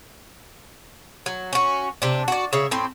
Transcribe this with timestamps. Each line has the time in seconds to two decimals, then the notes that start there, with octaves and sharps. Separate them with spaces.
1.26 F#3
1.53 C#4 F#4
2.02 C3 D4
2.28 F#4 D5
2.53 C#3 C#5 E5
2.71 A2 C4 C5